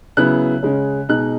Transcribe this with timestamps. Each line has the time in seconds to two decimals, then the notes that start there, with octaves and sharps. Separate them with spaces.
0.17 C#3 F#3 B3 E4 F#6
0.63 C#3 G#3 C#4
1.09 B2 G#3 D#4 F#6